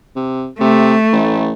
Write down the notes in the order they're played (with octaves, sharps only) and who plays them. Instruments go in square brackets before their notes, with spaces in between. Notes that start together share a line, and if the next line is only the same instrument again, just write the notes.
[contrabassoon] C3
[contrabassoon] C3 [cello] A3
[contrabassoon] A1